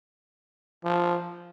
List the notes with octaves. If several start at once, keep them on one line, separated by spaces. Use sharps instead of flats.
F3